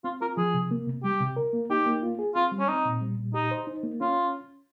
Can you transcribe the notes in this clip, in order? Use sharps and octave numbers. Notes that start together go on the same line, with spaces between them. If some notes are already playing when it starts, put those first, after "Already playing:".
C4 F4
F4 A#4
F3 G#4
C3
A#3
C3
G3 G4
C3
A#4
A#3
D#4 G4
A#3
F4
G#4
C4 F4
G3
C#4
C4 D#4
A#2
G3
A#2
D#4 G4
C5
D#4
A#3
C#4 F4